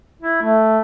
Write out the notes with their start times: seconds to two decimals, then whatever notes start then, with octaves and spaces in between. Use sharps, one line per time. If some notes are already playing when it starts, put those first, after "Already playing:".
0.22 E4
0.42 A3